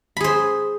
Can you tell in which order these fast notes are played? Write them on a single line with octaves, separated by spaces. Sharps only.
B5 G#4 C5